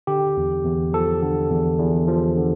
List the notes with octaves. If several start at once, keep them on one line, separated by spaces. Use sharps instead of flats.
D3 G4
E2
E2
F3 A4
D3
E2
E2
F3
D3